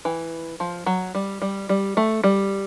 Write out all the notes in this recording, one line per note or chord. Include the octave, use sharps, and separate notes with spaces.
E3
F3
F#3
G3
G3
G3
A3
G3